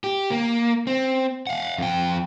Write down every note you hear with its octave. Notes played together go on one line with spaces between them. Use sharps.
G4
A#3
C4
F5 F#5
F2 G5